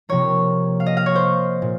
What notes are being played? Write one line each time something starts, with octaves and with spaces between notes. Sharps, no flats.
C3 F3 A#3 C#5
F5
D#5
F5
C#5
C5
A#2